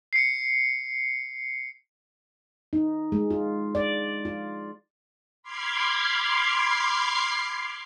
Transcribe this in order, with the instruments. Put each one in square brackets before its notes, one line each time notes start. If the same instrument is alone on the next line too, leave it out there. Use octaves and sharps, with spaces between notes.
[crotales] C7 C#7
[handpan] D#4
G#3
F4
D5
F4
[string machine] B5 C6 D6 F6 G#6 C7